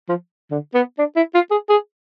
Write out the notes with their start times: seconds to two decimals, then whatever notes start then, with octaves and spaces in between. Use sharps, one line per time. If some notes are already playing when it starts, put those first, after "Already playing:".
0.09 F3
0.51 D3
0.74 B3
0.99 D4
1.16 E4
1.34 F4
1.51 G#4
1.69 G#4